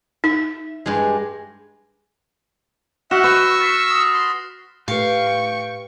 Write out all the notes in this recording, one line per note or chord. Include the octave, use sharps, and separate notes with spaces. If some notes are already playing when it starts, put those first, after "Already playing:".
D#4 E5
G2 G#3
F#4 E5 F#5 F6 A#6 E7
B4 C#6 E6
A6 B6 C7
D#6
C6 D#6
A2 G4 B4 F5 G5 C#6